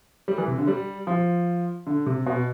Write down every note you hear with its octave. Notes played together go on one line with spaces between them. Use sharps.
G3
E3
C3
D3
G3
F3
D3
C3
B2